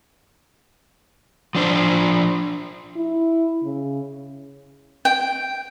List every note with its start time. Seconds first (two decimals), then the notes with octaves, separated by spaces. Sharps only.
1.55 F3 D4 C5
2.96 E4
3.63 C#3
5.05 G5